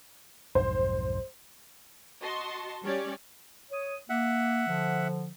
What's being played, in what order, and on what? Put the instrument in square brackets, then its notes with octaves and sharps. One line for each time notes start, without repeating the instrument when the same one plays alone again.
[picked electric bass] B1 F2 G#2 [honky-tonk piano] C5
[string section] F#4 D#5 A5 C6 C#6
G3 C#4 G4 C#5 D5
[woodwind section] C#5 D#6
[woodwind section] A#3 [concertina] E5 F#5
[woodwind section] D3 F3